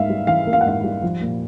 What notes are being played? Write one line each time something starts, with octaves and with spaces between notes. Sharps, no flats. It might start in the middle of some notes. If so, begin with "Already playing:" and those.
Already playing: G#2 A#3 E5 F5
G3
E3 F5
A#3
F5
F#5
G#2 F5
G3
F3
A#2